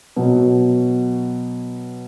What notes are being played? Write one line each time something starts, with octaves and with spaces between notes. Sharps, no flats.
B2 F#3